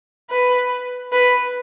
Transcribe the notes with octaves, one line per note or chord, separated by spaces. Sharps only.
B4
B4